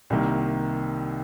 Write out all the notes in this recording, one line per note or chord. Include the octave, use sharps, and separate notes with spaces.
C2 C3 D#3 A#3